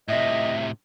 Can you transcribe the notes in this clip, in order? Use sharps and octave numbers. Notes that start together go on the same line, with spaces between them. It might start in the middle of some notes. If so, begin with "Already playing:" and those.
A2 C3 D#5 E5